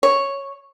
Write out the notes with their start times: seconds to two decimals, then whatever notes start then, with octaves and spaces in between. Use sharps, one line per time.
0.03 C#5